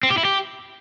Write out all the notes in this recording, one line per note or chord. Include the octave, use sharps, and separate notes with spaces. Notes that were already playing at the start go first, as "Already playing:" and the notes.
C4
G4
E4
G4